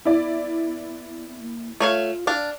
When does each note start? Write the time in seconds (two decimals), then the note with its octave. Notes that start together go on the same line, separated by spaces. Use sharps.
0.05 B3 E4 D5
1.40 A#3
1.80 A3 F4 C#5 F5
2.27 D4 D5 F5